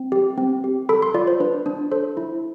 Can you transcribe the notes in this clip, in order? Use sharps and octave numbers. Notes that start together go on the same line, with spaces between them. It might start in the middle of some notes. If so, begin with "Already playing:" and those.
Already playing: C4
G4
C4
G4
A4 B5
C6
F4 D5
C5
D4 B4
D4
A4 C5
E4